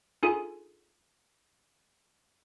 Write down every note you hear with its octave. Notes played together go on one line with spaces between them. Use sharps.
D4 D#4 F4 G#4 A4 G#5